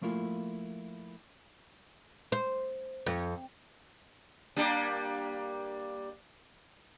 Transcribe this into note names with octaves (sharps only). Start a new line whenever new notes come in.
F3 A3 A#3 E4 F4
C5
F2
G3 A#3 D4